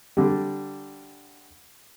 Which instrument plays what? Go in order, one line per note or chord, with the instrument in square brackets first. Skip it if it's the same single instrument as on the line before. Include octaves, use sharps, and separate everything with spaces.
[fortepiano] D3 G3